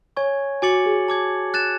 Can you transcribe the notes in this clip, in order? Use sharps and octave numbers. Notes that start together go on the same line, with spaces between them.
C#5 G#5 C#6 G#6
F#4 G#5 D6 A6 C#7 F#7
G#4
A5 D6 G#6
F#6 A6 E7